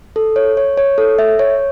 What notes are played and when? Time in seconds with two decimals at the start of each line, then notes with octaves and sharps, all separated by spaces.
0.16 A4
0.36 C#5
0.57 C#5
0.77 C#5
0.98 A4
1.19 E5
1.39 C#5